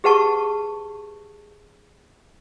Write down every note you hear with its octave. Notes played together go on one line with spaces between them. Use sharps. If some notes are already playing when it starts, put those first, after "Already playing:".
G4 G#4 B4 F#5 A5 C#6